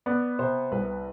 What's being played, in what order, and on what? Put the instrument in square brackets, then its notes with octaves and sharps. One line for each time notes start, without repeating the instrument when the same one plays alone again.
[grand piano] B3 [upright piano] D5
[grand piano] C3 [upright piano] C5
[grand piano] C2 [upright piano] B4